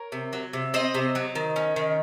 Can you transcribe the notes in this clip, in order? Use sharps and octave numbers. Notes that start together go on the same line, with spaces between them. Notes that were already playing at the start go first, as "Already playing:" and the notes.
Already playing: A#4 C#5
C3
F#3
C3
C4 C5 D#5
C3
F#3
D#3
C#4
D#3